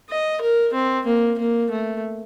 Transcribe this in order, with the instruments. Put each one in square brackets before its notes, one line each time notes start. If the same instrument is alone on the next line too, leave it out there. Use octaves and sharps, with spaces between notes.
[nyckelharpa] D#5
A#4
C4
A#3
A#3
A3